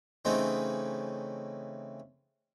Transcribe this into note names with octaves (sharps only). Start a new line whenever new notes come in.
C#3 E3 A3 C4 D#4